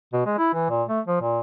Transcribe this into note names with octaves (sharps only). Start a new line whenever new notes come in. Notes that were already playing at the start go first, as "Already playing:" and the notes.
B2
G#3
E4
E3
A#2
A3
F3
A#2